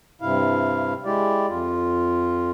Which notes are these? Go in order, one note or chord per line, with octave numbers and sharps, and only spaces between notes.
G2 C3 E4 F5
G#3 E4 G4 D5
F2 F4